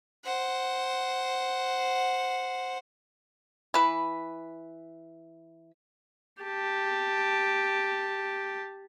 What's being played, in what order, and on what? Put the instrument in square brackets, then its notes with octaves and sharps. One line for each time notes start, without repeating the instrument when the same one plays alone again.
[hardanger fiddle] C5 F#5
[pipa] E3 B4
[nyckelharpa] G4 A5